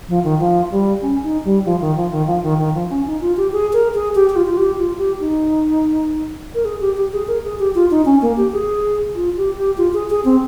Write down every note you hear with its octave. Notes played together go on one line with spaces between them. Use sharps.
F3
D#3
F3
G3
C#4
D#4
G3
F3
D#3
F3
D#3
F3
D#3
D#3
F3
C#4
D#4
F4
G4
G#4
A#4
G#4
G4
G4
F4
F4
G4
F4
G4
D#4
A#4
G#4
G4
G4
G#4
A#4
G#4
G4
F4
D#4
C#4
A#3
G4
G#4
F4
G4
G4
F4
G#4
G#4
C4